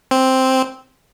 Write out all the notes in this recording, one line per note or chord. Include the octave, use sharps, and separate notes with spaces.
C4